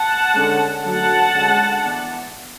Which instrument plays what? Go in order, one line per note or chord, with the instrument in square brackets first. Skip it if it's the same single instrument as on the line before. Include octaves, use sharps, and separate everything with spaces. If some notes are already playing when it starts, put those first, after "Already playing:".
Already playing: [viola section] F#5 A5
D3 G#3 C#4
D3 F#3 A3 F#5 A5
D3 G#3 C#4
E3 B3 D4